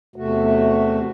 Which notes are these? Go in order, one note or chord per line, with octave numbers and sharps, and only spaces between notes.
E2 C3 A3 F#4